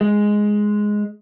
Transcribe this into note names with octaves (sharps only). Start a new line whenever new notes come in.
G#3